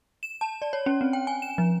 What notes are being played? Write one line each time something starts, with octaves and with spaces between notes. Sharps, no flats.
E7
A5
D5
C#5
C#4
C4
G5
G#5
E7
F3